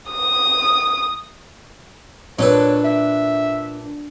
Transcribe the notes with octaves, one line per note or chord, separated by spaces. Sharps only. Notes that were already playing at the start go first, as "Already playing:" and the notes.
D#6
A#2 D4 A4 B4 C#5
E5